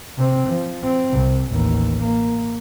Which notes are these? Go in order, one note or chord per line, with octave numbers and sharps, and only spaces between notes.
C3 C4
F3
C4
C2
A1 D#2
A#3